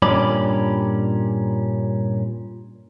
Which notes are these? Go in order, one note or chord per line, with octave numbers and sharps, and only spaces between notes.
G2 A#2 C#4 D5 B5